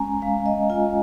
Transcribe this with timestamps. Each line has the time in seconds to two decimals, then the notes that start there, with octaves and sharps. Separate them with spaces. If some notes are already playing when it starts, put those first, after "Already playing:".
Already playing: G#3 C#4 G#5 A#5
0.22 G#3 F5
0.46 D#5
0.70 F4 G#5